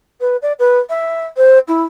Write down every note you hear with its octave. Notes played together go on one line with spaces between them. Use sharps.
B4
D5
B4
E5
C5
E4